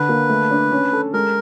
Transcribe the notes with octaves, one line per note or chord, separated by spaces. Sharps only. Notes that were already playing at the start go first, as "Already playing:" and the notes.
Already playing: D3 B4
A#3
A3
D4
C#4
A4
G#3 A#4